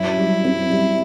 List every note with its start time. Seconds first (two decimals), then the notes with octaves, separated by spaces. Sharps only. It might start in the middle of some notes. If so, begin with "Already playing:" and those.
Already playing: F#2 E4
0.17 G3
0.45 C4
0.70 G3